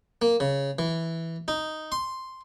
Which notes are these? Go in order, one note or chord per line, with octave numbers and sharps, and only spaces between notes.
A#3
C#3
E3
D#4
C6